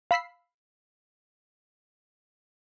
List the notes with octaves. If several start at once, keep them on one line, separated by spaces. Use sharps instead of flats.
F5 B5 E6 B6 C7